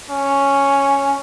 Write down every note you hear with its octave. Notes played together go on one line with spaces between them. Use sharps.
C#4